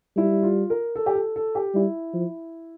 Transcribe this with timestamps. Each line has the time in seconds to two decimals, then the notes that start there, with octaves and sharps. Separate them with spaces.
0.16 G3 E4
0.43 F4
0.70 A#4
0.96 A4
1.06 G4
1.15 A4
1.36 A4
1.55 G4
1.74 G3 E4
2.14 F3